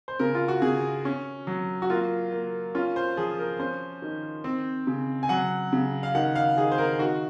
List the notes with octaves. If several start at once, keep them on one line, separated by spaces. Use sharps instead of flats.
C5
C#3 A#4
F4
F#4
C#3 G#4
C#4
F#3
F#4
A#3 F4
A#3
C#4 F4
C5
F3 G#4
A#4
C#4 C5
D#3
C4
C#3
G#5
F#3 F#5
C#3
F5
D#3 F#5
F5
D#3 G#4
C5
A#4
D#3 F#4